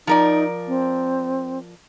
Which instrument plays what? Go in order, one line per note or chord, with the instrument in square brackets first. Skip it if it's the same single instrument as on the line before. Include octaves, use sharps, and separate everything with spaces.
[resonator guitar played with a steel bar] F3 A#4 D5 [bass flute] D#4
[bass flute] C4